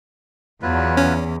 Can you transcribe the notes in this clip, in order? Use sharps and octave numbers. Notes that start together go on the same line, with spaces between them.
E2 F#3 F4 B4
C#4